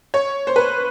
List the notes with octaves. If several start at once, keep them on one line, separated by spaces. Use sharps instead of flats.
C#5
C5
B4